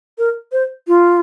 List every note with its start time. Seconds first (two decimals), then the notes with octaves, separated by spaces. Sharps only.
0.18 A#4
0.52 C5
0.88 F4